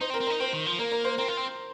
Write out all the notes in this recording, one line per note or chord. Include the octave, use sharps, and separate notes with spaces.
D#4 C5
C4
A#4
C4
D#4 A#4
C4 C5
D#3
F3
A#3 A#4
A#4
C5
C4 A#4
F4
C4